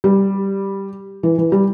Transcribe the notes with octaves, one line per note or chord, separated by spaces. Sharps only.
G3
E3
E3
G3